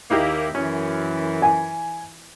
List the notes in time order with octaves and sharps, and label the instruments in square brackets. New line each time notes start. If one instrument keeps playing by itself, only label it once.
[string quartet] D#2 [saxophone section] A#3 [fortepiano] D#4 E4 G4
[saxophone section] F#2 [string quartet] E3 [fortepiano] C#4
[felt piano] G#5